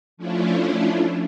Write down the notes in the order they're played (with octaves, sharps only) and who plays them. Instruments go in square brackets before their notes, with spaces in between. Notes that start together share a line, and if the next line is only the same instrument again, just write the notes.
[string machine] F3 A3 C#4 D4 E4 F4